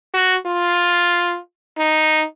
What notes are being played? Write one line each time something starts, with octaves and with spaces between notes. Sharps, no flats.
F#4
F4
D#4